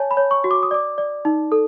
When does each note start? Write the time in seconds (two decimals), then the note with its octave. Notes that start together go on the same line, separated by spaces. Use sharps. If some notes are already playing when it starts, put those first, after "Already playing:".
Already playing: C#5 G#5 A5
0.11 B5
0.17 C#5
0.31 C#6
0.44 F#4
0.51 D6
0.63 D#6
0.71 D5 D6
0.98 D5
1.25 D#4
1.52 A4